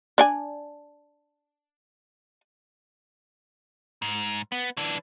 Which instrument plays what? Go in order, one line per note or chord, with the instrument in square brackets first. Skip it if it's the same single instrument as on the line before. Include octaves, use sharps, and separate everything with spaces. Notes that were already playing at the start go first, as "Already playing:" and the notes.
[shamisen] D4 D5 G#5
[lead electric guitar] G#2
B3
E3 D4